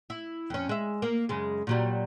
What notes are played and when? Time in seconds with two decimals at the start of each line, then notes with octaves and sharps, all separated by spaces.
0.10 E4
0.50 F2 C#4
0.69 G#3 E5
1.02 A#3
1.29 F#2 C#3 G#3
1.67 A#2 F#3 G3